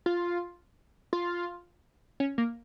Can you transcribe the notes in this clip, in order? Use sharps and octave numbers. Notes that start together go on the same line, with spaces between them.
F4
F4
C#4
A#3